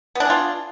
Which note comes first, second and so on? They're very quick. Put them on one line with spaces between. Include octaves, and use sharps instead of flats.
B3 D4 G#4 F4